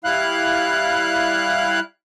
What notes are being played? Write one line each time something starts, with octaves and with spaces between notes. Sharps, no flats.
G3 E4 F5 F#6